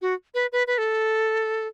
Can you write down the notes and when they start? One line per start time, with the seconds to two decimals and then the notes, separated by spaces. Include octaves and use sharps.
0.02 F#4
0.34 B4
0.52 B4
0.67 B4
0.78 A4